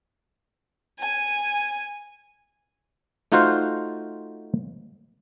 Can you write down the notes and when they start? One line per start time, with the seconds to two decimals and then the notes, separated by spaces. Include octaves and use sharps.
0.99 G#5
3.32 A3 D#4 F4 F#4 C5 F5